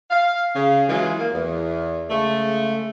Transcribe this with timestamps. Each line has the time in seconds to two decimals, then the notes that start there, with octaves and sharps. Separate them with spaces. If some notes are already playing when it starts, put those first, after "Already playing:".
0.10 F5
0.55 C#3
0.89 E3 F#3 G#3 F4
1.19 A#3
1.33 E2
2.09 C#3 G#3 A3